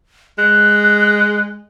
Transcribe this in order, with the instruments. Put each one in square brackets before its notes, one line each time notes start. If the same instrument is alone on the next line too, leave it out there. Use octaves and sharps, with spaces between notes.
[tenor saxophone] G#3 [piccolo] F#6